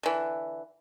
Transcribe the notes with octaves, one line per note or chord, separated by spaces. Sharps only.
D3 E3